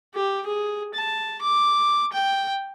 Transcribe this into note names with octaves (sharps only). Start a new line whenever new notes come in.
G4
G#4
A5
D6
G5